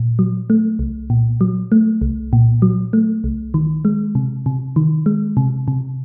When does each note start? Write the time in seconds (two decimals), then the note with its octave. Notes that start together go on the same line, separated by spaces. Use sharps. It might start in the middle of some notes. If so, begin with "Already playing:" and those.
Already playing: A#2
0.19 F#3
0.50 A3
0.79 C2
1.10 A#2
1.41 F#3
1.72 A3
2.01 C2
2.33 A#2
2.62 F#3
2.93 A3
3.24 C2
3.54 D#3
3.85 G#3
4.15 C3
4.46 C3
4.76 D#3
5.06 G#3
5.37 C3
5.68 C3